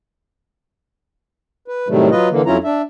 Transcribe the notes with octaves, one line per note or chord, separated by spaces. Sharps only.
B4
A2 C3 D#3 F#3 G3 A3
F#3 F4 B4 D#5
D3 E3 A#3
F2 F#3 C#4 E4 F4 A#5
D4 E5